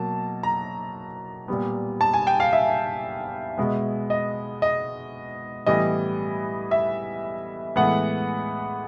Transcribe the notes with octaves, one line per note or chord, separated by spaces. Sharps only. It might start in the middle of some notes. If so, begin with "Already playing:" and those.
Already playing: B2 F#3 A#3 A5
A#5
A#2 G3 B3
A5
G#5
G5
F5
E5
B2 G#3 B3
D#5
D#5
A2 E3 G3 B3 D#5
E5
A2 E3 G#3 B3 F#5